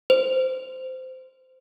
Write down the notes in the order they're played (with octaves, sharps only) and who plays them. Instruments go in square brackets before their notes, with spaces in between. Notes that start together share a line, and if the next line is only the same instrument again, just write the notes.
[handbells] C5